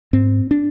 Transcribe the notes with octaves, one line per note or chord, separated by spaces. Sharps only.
G#2 C4
D4